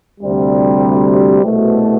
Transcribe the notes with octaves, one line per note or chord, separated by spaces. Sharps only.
D2 C3 G3
C2 B2 A3